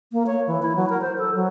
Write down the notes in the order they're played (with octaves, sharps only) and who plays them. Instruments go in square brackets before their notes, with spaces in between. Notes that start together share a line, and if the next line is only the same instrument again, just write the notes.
[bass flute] A#3
C#5
E3
E4
F#3
A#4
C5
A4
F#3